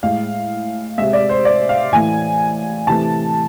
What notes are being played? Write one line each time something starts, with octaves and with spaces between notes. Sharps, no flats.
A2 G#3 F5
C3 G#3 E5
D5
C5
D5
F5
A2 E3 A3 G#5
C3 E3 A3 A5